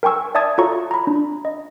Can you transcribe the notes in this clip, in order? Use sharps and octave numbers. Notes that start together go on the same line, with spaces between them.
A#4 G5 G#5 C#6 E6
D5 E5 A5 D#6 G#6 A6
F4 F#4 A4 C#5 A#5 C#6
A#5 B5
D4
D#5